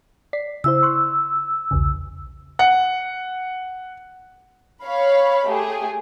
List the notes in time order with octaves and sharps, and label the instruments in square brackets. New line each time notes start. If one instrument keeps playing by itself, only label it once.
[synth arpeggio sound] D5 B6 C7
[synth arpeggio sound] C#3 E4 C5 [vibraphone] E6
[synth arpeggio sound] C6 C#6 F#6
B1 E2 C#3
[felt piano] F#5
[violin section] C#5 F5 B5
A3 G4 G#4